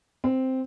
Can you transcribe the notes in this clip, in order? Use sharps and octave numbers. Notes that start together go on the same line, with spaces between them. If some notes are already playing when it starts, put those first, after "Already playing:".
C4